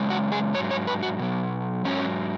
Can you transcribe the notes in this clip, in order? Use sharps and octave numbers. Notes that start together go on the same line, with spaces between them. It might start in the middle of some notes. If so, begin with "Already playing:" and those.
Already playing: F#2 C#3 G#3
F#4
G#4
G#2 F#3 C#5
C#5
B4
F#4
B2 F#3
G#2 F#3 C#4